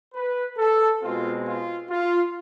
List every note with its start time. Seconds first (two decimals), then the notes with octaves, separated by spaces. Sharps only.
0.14 B4
0.58 A4
1.01 B2 G#3 C4 F4
1.46 F4
1.90 F4